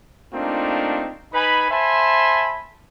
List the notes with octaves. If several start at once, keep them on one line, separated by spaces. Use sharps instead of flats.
A3 A#3 C4 D4 D#4 F4
D#4 B4 G#5 B5
C5 E5 G#5 A5 B5 C6